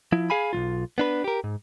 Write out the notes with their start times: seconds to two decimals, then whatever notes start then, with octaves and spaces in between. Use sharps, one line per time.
0.12 F3 E4
0.30 G#4 F5 G#5 B5
0.53 B1 F3 F4
0.98 B3 D4 B4
1.24 G4 A#4
1.44 G#2